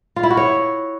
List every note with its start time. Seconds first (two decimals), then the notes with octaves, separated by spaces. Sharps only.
0.16 F4
0.23 E4
0.30 F#4
0.37 C#5